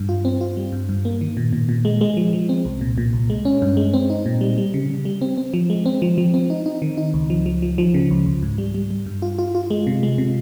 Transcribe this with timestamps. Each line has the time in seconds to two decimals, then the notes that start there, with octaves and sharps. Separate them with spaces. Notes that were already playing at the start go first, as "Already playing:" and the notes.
Already playing: G2
0.09 F4
0.25 C4
0.41 F4
0.57 G3
0.72 G2
0.89 G2
1.05 A#3
1.21 D#3
1.37 A#2
1.53 A#2
1.69 A#2
1.85 G#3
2.01 G#3
2.17 F3
2.33 F3
2.49 C4
2.65 C2
2.81 A#2
2.98 A#2
3.13 C2
3.30 G#3
3.45 C#4
3.62 G2
3.77 G#3
3.94 C4
4.10 D#4
4.26 A#2
4.41 G3
4.58 G3
4.74 C#3
4.90 C#3
5.05 G3
5.21 C4
5.38 C4
5.54 F3
5.70 G#3
5.86 C4
6.02 F3
6.18 F3
6.34 C4
6.50 D#4
6.66 D#4
6.82 D#3
6.97 D#4
7.14 C#2
7.30 F3
7.46 F3
7.62 F3
7.78 F3
7.94 C#3
8.11 C#2
8.26 C#2
8.43 G#2
8.58 G3
8.74 G3
8.90 G3
9.06 G2
9.22 F4
9.38 F4
9.55 F4
9.70 G#3
9.87 C3
10.03 G#3
10.18 C3